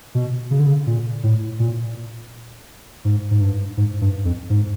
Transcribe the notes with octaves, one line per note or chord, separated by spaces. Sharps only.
B2
C#3
D3
C#3
A#2
A2
A#2
G#2
G#2
G2
G#2
G2
F2
G#2